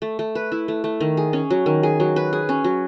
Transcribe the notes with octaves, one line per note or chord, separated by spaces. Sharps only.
A3
A3
B4
E4
A3
A3
D#3
G#4
C#4
F#3
D#3
G#4
F#3
B4
G#4
C#4
F#3